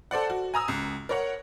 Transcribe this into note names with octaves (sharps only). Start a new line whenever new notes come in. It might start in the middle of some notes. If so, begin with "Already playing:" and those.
A4 C5 D5 F#5
F#4
G#5 A#5 D#6 E6
C#2
A#4 C#5 F#5